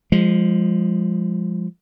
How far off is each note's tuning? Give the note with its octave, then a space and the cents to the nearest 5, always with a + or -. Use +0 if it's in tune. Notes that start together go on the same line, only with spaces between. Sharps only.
F3 +0 G#3 -25